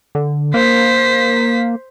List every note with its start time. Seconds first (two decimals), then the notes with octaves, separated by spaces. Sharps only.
0.15 D3
0.54 A#3 C5 B6